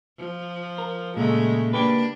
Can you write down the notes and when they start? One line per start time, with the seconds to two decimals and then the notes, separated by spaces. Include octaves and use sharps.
0.18 F3
0.78 A#4
1.16 A#2 C#3 G#3 A3
1.73 A#3 D4 G4 B4